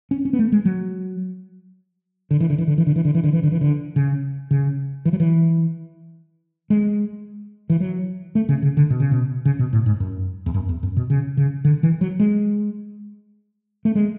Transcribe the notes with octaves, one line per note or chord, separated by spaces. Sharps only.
C#4
C#4
B3
A3
G#3
F#3
D3
E3
D3
E3
D3
E3
D3
E3
D3
E3
D3
E3
D3
E3
D3
C#3
C#3
E3
F#3
E3
G#3
E3
F#3
A3
C#3
C#3
D3
B2
C#3
B2
C#3
B2
A2
G#2
F#2
E2
F#2
E2
F#2
B2
C#3
C#3
D3
E3
F#3
G#3
A3
G#3